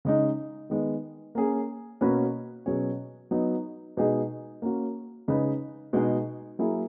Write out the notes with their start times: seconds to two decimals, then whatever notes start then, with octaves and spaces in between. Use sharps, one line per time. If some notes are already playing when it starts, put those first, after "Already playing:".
0.05 C#3 G#3 D#4
0.70 D#3 G#3 B3
1.35 A#3 C#4 G#4
2.01 B2 A#3 C#4 F#4 B4
2.66 B2 F#3 C#4 G#4 C#5
3.31 F#3 B3 D#4
3.97 B2 G#3 D#4 G#4
4.62 A#3 C#4 F#4
5.28 C#3 G#3 D#4 G#4 B4
5.93 B2 G#3 D#4 G#4
6.59 F#3 A#3 E4 G#4